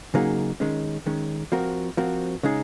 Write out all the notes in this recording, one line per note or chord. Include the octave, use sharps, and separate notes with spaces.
C#3 F#3 A#3 D#4 G#4
D#3 G#3 C#4
D#3 G#3 C#4
F3 C4 F#4 A#4
F3 C4 F#4 A#4
C#3 G#3 D#4 G#4